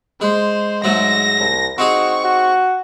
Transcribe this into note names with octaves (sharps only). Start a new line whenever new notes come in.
G#3 C5
G#2 F#3 A3 A#6
C2
C4 D#4 F#4 G#4 C#6
F#4